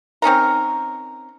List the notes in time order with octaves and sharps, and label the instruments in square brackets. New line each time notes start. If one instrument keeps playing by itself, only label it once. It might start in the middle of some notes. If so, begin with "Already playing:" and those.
[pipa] C4 C#4 D#4 A#4